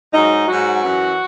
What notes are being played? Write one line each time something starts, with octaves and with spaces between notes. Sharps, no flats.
G#2 F#3 D#4
G#2 F#3 F#4
F#2 E3